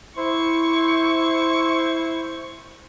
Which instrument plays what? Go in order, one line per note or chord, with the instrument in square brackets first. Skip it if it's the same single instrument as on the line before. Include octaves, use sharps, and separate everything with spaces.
[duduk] E4 [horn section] C5 [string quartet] C#6